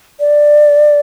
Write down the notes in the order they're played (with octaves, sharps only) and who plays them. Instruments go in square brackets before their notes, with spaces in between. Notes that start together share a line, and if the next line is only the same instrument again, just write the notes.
[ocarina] D5